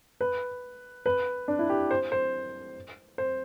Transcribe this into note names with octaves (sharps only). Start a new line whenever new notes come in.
B4
B4
D4
E4
G4
C5
C5
C5